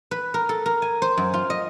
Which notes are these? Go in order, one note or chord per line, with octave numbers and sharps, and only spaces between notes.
B4
A#4
A4
A#4
G#5
C5
F#2
F4
D#5